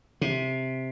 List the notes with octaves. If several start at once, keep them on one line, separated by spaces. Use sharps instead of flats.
C3